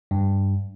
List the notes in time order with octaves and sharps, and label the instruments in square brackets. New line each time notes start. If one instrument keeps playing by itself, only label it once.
[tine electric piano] G2